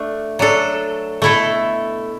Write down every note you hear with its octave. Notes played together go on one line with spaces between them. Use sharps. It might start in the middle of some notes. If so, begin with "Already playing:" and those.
Already playing: A3 D4
F#3 D4 A4
B2 A3 E4 A4